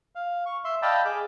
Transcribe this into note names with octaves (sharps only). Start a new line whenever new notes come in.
F5
C#6
E5 C6
D5 D#5 F5 G5 A5 B5
G#4 D6